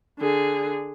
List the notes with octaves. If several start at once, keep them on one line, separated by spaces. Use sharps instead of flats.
D3 G#4